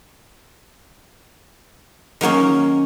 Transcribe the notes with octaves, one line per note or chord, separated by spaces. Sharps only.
D#3 F#3 A#3 C#4